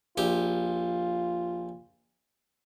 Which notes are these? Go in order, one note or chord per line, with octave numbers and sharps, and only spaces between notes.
A#1 F4 G4